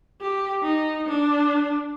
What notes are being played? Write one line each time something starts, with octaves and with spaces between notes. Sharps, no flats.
G4
D#4
D4